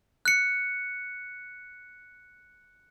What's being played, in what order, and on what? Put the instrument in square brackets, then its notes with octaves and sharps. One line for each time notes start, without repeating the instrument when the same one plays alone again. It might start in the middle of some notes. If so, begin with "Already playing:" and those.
[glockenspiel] F#6 C#7